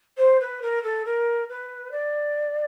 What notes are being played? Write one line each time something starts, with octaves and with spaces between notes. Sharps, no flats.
C5
B4
A#4
A4
A#4
B4
D5